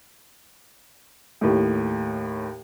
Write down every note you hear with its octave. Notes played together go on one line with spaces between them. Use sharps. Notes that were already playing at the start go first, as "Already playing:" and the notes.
D#2 A2